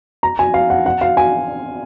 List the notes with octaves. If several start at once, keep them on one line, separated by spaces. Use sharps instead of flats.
A#5
G#5
F5
F#5
F#5
F5
G#5